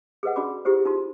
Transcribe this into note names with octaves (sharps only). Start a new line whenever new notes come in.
G#4 A4 B4 D#5 F#5
D4 F#4 D5 B5 D6
E4 F4 G4 G#4 C5
D#4 F4 C6